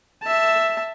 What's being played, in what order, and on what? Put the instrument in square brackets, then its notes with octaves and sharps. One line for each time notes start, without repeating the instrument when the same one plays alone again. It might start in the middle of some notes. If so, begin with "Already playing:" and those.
[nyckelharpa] E5 A5